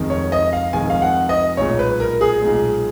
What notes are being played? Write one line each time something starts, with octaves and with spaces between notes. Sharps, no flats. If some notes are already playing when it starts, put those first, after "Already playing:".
Already playing: F1 F2 D#3 G#3
C#5
D#5
F5
F1 F2 D#3 G#3 G#5
F5
F#5
D#5
B1 A#2 G#3 C#5
B4
A#4
G#4
B1 A#2 G#3